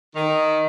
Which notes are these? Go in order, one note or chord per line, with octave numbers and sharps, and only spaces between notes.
D#3